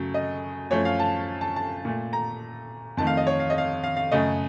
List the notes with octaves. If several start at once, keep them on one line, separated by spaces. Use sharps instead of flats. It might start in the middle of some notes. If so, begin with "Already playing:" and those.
Already playing: F#2 C#3 F#3 A3
D#5
F#2 F3 A3 C#5
F5
A5
A5
A5
A#2 A3
A#5
F2 D#3 A3 A5
F5
D#5
C#5
F5
D#5
F5
F5
F5
F#2 C#3 A3 D#5